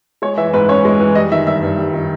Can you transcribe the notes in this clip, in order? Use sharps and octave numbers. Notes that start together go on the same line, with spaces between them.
G#3 C#5
E3 E5
G#2 B4
C#4 C#5
G#3
E3
G3 D#5
D#3 E5
G2 E5
G2
G3
D#3